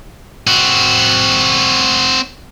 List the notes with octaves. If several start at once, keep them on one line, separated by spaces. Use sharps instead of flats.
C4 F#4